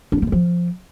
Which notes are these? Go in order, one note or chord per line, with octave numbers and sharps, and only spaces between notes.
D4
G3
A#3
G#3
F3